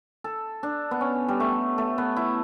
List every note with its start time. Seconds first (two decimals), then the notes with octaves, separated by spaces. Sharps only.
0.24 A4
0.63 D4
0.91 B3
1.01 C#4
1.28 G3
1.40 A3
1.78 A3
1.98 B3
2.16 E4